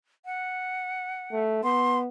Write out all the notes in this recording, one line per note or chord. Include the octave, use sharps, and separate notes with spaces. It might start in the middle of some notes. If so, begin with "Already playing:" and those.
F#5
A3
B3 C6